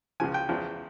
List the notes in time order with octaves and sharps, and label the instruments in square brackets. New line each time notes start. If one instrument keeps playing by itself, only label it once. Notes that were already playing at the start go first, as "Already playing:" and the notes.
[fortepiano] C#2 C#3 F3 G#5
G5
E2 C#3 F3